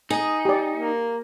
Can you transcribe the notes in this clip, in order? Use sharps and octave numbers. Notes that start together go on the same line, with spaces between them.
D#4 G#4
G4 D5
A#3